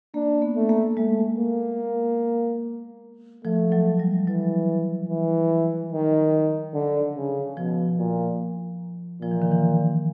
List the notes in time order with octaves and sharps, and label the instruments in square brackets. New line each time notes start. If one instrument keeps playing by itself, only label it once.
[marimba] A#3 [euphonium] D4
[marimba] B3
[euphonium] A3
[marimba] A#3
[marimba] G#3 [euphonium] A3
[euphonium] A#3
[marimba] F3 [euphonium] A3
[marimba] F#3
G3
[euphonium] E3 [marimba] F#3
[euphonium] E3
D#3
D3
C#3
[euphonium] B2 [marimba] F3
[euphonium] A#2
[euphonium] A#2 [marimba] F3
[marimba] E3
D#3
E3